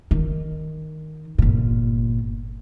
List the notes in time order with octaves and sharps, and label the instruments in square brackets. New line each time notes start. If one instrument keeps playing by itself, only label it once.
[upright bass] D#3
G1 A#2